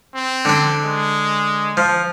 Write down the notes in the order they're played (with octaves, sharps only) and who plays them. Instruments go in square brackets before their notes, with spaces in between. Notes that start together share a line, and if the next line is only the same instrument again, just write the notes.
[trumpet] C4
[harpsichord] D3 D4
[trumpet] G#3
[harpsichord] F3